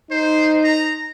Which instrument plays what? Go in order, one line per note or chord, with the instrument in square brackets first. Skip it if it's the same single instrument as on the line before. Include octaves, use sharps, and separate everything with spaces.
[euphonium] D#4 [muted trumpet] C5
[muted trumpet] A#5